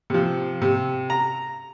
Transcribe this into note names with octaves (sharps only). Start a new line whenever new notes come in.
C3 F3
C3
A#5